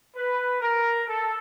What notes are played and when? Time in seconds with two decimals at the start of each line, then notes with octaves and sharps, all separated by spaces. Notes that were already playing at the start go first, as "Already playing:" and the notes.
0.15 B4
0.61 A#4
1.08 A4